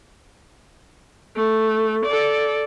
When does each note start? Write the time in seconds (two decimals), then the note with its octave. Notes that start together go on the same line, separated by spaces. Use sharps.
1.36 A3
2.06 A4 D5